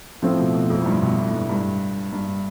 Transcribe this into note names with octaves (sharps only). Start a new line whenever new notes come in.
A2 F3 A3 C4
B2
B2
F2
A2
G2
B2
A2
G2
G2
G2